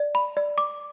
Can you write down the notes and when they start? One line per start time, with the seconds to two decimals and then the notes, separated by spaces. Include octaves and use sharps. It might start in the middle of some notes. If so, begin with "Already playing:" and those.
Already playing: D5
0.15 B5
0.37 D5
0.58 D6